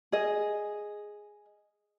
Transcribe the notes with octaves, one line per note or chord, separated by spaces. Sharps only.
G#4 D#5